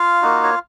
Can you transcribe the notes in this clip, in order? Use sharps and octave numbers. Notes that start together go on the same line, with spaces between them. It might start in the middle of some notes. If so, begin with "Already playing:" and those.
Already playing: F4 F5
A#3 D#4 F#4
C#5